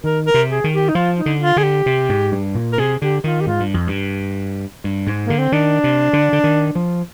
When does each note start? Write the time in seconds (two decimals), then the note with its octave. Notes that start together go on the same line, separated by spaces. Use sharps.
0.03 D#3 A#4
0.26 A#4
0.34 C3
0.50 G#4
0.64 D#3
0.72 G4
0.89 D#4
0.95 F3 F4
1.18 D#4
1.26 D3
1.41 F4
1.56 D3 G#4
1.63 G4
1.86 C3
2.09 G#2
2.32 G2
2.55 A#2
2.72 A#4
2.78 C3 G#4
3.01 D3 G4
3.24 D#3 F4
3.41 G4
3.47 G#2 F4
3.60 G2
3.74 F2
3.87 G2
4.84 G2
5.07 G#2
5.26 D3 A#3
5.38 C4
5.52 D#3 D4
5.84 C3
6.13 D3
6.33 D3
6.44 D#3
6.75 F3